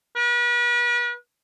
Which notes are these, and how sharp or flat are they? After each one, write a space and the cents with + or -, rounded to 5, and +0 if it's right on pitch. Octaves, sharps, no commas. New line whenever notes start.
B4 -40